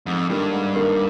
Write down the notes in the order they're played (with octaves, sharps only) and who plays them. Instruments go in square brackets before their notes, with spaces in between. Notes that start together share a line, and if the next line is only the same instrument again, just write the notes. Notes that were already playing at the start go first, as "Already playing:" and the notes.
[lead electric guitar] F2 [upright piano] G#2
[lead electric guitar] G2 [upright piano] D#3 G3 A#3 D4
[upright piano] G#2
D#3 G3 A#3 D4